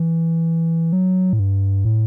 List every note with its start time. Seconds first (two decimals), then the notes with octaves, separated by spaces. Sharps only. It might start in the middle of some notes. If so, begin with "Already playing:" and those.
Already playing: E3
0.93 F#3
1.33 A2
1.39 G2
1.85 A2